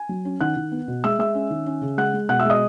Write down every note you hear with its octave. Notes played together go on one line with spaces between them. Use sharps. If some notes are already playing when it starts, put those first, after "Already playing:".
Already playing: G#5
F#3
C#4
D#3 F#5 F#6
D#3
B3
B2
G#3 E5 E6
G#3 E5 E6
C#4
D#3
C#4
C#3
G#3 F#5 F#6
G#3
B2 F#5 F#6
E5 E6
G#3 D#5 D#6